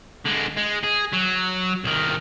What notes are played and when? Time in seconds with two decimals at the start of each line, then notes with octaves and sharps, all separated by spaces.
0.26 D3 G#3
0.57 G#3
0.84 G#4
1.13 F#3
1.84 C2 D#3